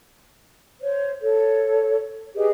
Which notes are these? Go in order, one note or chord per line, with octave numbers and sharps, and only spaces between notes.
C5 C#5
A4 C#5
G4 G#4 B4 D#5